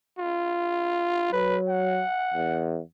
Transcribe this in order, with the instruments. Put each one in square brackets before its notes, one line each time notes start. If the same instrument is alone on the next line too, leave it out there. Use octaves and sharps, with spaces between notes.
[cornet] F4
[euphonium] F#3 [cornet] B4
[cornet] F#5
[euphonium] E2